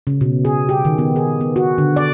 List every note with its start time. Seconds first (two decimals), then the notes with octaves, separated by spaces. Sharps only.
0.07 C#3
0.21 B2
0.45 G#4
0.69 G4
0.85 D#3
0.98 B3
1.16 G#4
1.41 B3
1.56 F#4
1.78 D3
1.96 D5